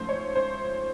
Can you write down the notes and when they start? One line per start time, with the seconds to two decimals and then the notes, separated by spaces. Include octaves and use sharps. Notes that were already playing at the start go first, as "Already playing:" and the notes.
Already playing: G#2 F3 A3 C#4 C5
0.09 C#5
0.35 C5